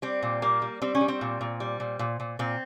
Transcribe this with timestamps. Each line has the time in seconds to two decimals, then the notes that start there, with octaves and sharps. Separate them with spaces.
0.02 G3 C4
0.23 A#2
0.42 G3 A#3
0.62 G3
0.82 G3 C4
0.95 C#4
1.01 G3
1.08 C4
1.21 A#2
1.41 A#2
1.60 G3
1.80 A#2
1.99 A#2
2.20 A#2
2.39 A#2 C4